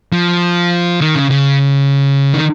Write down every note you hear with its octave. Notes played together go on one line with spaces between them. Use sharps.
F3
D#3
C#3
C#3
D#3